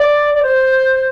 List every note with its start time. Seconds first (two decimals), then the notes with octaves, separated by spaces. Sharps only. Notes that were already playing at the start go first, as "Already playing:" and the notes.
Already playing: D5
0.34 D5
0.43 C5